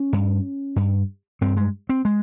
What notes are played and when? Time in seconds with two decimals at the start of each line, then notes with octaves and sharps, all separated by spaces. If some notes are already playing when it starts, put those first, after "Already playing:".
Already playing: C#4
0.13 G2
0.76 G2
1.41 G2 C4
1.57 G#3
1.89 C4
2.05 G#3